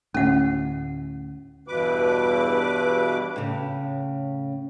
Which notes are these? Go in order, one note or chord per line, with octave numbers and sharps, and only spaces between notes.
D2 A2 C#4 F#5
E2 G2 B2 B4 D6
A2 C#3